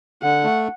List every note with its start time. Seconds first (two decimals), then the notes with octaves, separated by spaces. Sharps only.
0.23 D3 F#5
0.44 A3